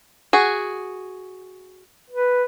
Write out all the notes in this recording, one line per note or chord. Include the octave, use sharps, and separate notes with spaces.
F#4 G#4
B4